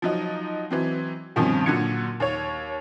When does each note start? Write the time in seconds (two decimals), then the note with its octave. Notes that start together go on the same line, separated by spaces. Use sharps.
0.02 F3 F#3 D#4
0.71 E3 F#3 C4
1.36 G2 B2 D#3 F3 C4 C#4
1.66 A#2 D3 F#3 F#4 G#6 C#7
2.20 D#2 C#5